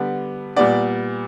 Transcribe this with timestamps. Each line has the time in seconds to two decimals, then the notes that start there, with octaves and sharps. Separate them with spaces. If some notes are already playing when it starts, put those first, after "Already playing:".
Already playing: D3 G3 B3
0.56 A#2 G3 B3 D5